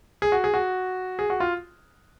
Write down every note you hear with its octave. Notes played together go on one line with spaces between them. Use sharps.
G#4
F#4
G#4
F#4
G#4
F#4
F4